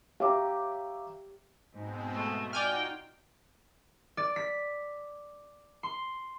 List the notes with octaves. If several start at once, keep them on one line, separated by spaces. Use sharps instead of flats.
G4 C#5 E5 F5 A#5 D6
G#2 B2 G#3 C4
A3
D#4 F4 F#4 D5 G5 G#5 F6 G6
D5
B6
C6